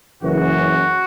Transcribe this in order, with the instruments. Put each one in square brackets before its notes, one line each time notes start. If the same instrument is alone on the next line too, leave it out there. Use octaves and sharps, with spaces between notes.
[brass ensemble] F#1 F#2 C#3 E3 [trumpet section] F#4